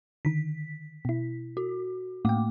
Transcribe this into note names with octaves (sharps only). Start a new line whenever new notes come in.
D3 D#3 B6
B2 E4
F#4
A2 A3 A#3 G5 D6